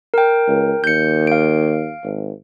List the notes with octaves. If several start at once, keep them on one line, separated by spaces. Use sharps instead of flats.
A#4 G5
C#2
D#2 G6 C#7
F5 D7
G#1